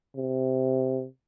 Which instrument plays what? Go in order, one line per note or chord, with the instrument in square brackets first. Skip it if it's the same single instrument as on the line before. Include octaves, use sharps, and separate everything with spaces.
[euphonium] C3